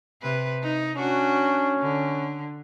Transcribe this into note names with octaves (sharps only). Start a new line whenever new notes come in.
C3 B4
D#4
C#4 D4 F#4
D3